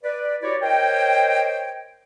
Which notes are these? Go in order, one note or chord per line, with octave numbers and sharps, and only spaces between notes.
B4 D5
E4 F#4 G4 C#5 D5
A#4 C5 C#5 D#5 G5